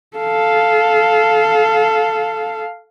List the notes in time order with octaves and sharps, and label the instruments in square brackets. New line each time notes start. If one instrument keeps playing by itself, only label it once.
[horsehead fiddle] A4 F5